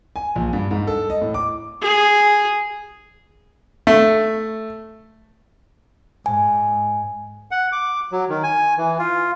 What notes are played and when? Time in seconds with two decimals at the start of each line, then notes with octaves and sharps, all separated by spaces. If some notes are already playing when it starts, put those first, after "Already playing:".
0.16 G#5
0.36 A#1
0.53 G2
0.71 G#2
0.87 A4
1.10 D#5
1.21 A2
1.34 D6
1.82 G#4
3.87 A3
6.26 G#2 G#5
7.51 F#5
7.72 D6
8.12 F#3
8.29 D#3
8.43 G#5
8.78 E3
8.99 F4